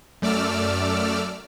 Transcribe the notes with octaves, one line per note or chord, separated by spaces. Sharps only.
F#2 A3 D5 D6 E6 F6